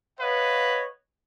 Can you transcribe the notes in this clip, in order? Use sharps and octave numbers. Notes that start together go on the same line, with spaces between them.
B4 C#5 D#5 F5 F#5